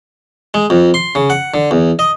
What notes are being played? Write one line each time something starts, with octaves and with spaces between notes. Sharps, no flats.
G#3
F2
C6
C#3
F#5
D3
E2
D#5